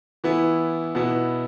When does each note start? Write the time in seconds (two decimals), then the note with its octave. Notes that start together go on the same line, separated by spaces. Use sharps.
0.24 E3 B3 E4
0.95 B2 B3 E4